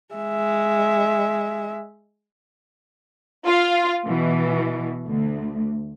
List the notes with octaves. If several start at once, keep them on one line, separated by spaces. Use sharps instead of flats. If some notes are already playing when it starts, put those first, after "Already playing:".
G#3 E5
F4 F5
B2 E3
D2